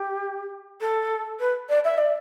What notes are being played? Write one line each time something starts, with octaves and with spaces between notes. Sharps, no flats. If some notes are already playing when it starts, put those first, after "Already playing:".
Already playing: G4
A4
B4
D5
E5
D5